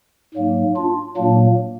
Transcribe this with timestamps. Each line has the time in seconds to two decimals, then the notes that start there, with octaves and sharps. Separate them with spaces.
0.34 G#2 F#3 A#3
0.76 D4 F4
1.17 A#2 F#3 A#3 D4